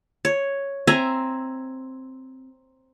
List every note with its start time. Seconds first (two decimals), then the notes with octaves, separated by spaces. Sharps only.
0.25 C#5
0.87 C4 E5 G#5 A#5